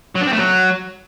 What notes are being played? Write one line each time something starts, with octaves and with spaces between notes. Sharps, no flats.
F#3
D4
C4
A3
F#3